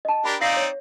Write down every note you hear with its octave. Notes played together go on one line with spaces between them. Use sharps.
D#5 A5
D4 G4 A#4 B5
C4 D#4 D5 F5 A#6 C7
C#5